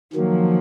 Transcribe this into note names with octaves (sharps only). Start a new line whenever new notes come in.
D#3 F3 F#3 A#3